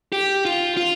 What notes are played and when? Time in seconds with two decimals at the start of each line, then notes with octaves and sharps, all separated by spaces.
0.12 G4
0.45 F4
0.77 F4